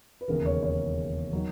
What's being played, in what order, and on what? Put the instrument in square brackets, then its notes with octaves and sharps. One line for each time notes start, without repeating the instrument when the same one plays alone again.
[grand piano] B4
E1 D#2 C#3 A#4
C#5
C#5
D#3 F#3